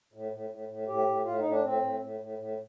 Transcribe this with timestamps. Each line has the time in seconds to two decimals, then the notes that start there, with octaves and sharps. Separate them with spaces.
0.14 A2
0.32 A2
0.50 A2
0.69 A2
0.88 A2 G4
1.07 A2
1.25 A2 F4
1.39 D#4
1.44 A2
1.51 D4
1.63 A2 C4
1.82 A2
2.01 A2
2.20 A2
2.39 A2